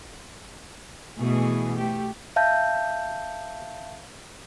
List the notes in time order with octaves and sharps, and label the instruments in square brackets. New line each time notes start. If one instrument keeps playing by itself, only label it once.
[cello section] B2 E3 A3 G#4
A3 G4
[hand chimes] E5 F5 A5 G6